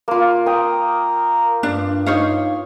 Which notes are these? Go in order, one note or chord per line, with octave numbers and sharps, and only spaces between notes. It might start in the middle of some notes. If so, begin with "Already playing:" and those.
A#3 F4
A#4 G5 D#6
G2 D4
D#4 C#5 F5